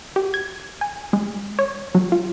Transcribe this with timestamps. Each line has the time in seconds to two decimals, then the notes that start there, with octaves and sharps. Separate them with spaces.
0.16 G4
0.34 G#6
0.81 G#5
1.13 G#3
1.59 C#5
1.95 F#3
2.12 F4